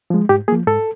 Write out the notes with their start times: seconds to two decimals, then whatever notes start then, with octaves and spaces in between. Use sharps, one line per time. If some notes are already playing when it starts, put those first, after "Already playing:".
0.10 F3 G#3
0.29 G#2 G4
0.48 F3 A#3 G#4
0.67 G#2 A4